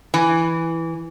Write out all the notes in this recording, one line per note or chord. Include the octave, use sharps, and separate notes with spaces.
E3